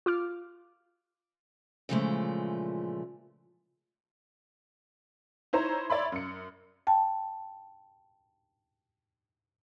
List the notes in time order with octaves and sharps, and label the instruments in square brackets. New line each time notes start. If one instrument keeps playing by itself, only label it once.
[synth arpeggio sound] F4 D6 F6
[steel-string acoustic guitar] A#2 C#3 E3 F3 G#3 A3
[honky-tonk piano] D#4 E4 C5 C#5 A#5
C#5 D5 E5 B5 C6
F#2 C#7
[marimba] G5 A5